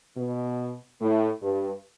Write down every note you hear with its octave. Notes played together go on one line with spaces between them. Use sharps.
B2
A2
G2